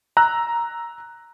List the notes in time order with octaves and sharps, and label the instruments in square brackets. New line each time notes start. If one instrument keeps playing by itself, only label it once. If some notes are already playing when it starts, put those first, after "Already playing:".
[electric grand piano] A#5 E6 F#6